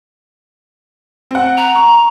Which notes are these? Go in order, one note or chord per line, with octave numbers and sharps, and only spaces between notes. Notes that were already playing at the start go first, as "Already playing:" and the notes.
C4 F#5
A#5
C#6